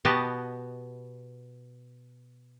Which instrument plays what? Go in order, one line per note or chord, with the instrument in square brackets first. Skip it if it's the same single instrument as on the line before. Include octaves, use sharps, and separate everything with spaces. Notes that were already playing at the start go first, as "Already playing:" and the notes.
[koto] B2 B3 F#4 G4 D#5 A5